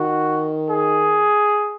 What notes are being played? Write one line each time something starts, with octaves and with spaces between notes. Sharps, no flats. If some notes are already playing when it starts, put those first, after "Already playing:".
Already playing: D#3 F#4
G#4